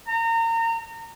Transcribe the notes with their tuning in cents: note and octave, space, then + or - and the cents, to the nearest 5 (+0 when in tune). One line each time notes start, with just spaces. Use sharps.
A#5 -30